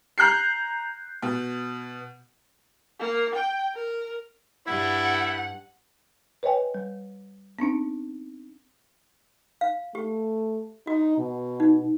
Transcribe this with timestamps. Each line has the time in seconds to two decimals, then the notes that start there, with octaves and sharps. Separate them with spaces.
0.18 A#5 F#6 G6 C7
1.22 B2
3.00 A#3
3.35 G5
3.75 A#4
4.67 G2 G3 E4 F#5
6.43 B4 C#5 D#5 G5 G#5
6.74 G3
7.59 B3 C4 D4 D#4
9.61 F5
9.95 A3 G4
10.87 D#4 F#4
11.19 B2
11.60 D#4